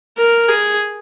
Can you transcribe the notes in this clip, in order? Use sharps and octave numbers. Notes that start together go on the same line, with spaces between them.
A#4
G#4